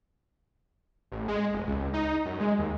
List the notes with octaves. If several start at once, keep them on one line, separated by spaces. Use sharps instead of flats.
A1
G#3
F1
C#2
D#4
F#2
G#3
D#2